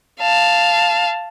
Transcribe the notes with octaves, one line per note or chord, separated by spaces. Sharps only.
F5 A5